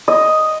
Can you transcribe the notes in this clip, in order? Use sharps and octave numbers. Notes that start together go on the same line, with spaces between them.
D#5